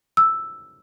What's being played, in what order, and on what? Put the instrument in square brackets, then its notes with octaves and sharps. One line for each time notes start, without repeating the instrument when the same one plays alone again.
[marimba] E6